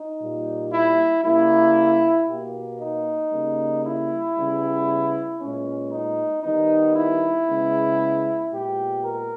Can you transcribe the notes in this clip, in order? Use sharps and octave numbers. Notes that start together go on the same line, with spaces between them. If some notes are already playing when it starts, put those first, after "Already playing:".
Already playing: D#4
A#2 G3 A#3
E4
C#3 G3 A#3 E4
B2 A#3 G4
D#4
C#3 G3 A#3
E4
C#3 G3 B3
A#2 G#3 B3 C#4
D#4
D#3 G3 B3 D#4
E4
C#3 G#3 B3
A#2 G#3 B3 G4
A#4